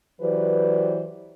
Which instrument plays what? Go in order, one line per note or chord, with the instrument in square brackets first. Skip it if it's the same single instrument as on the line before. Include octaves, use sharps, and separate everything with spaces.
[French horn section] E3 F#3 G4 B4 C5 D5